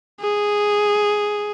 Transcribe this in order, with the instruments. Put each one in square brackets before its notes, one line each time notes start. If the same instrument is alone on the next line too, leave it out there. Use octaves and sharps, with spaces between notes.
[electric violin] G#4